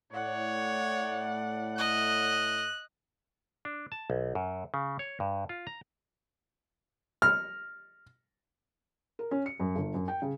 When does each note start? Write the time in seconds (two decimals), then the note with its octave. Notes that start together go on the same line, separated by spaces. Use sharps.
0.13 A2 C#5 D5 F#5
1.78 D#5 F#6
3.65 D4
3.92 A5
4.10 B1
4.35 F#2
4.74 C#3
4.99 C#5
5.20 G2
5.49 F4
5.67 A#5
7.22 F6
9.19 A#4
9.31 C#4
9.46 C#7
9.59 F#2
9.75 G1
9.94 F#2
10.08 G5
10.22 C#3